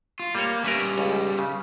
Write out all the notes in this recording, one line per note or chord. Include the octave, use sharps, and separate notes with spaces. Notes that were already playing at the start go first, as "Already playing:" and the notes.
F4
G3 A#3 C#5
G3 C#4 A#4 B4 E5
C#2
C#3